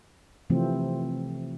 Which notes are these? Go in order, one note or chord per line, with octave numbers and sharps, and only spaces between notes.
C3 E3 F3 A3 C4